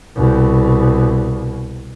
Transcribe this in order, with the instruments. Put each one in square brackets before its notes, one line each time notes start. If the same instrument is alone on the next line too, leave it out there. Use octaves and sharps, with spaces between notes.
[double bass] C2 B2